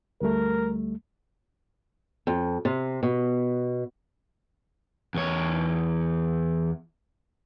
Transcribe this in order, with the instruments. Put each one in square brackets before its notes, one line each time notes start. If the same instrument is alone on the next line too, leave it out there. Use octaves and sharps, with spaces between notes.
[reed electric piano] D2 G3 A3 [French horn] A#4
[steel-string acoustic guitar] F2
C3
B2
[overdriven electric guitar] E2 C#5